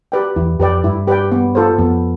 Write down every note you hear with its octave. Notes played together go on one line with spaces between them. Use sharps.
G4 B4 D5 G5
E2 E4
F2 G4 B4 D5 G5
G2 E4
G4 B4 D5 G5
B3
F4 A4 C5
F2 B3